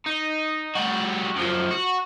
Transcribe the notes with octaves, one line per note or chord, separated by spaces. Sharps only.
D#4
G3 F#4
F#2 F3
F#4